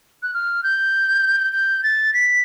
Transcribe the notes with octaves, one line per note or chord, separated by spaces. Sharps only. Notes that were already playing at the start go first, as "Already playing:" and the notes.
F#6
F6
G6
G6
A6
B6